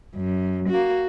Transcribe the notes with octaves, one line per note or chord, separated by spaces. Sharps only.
F#2
A#3 F#4